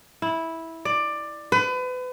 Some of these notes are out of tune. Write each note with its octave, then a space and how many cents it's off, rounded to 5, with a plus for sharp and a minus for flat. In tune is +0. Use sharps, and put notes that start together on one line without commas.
E4 -10
D5 +15
B4 +35